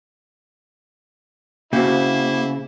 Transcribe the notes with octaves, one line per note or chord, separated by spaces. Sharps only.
C#3 A#3 C4 E4 F#4 G4